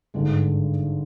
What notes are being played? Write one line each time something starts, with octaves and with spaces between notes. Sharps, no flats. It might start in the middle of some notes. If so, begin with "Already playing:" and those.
G#1 G2 D3 G#3